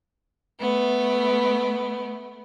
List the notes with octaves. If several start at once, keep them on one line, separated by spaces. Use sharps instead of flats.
A3 B3